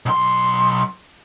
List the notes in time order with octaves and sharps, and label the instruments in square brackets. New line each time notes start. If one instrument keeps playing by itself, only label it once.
[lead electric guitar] B1 C6